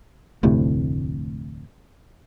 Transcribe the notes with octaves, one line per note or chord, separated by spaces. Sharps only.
F1 D2 A2 C3